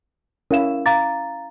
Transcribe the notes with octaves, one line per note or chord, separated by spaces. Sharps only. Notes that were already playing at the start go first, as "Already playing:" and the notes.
C#4 E4 A#4 F5 E7
F5 A#5 D6 A6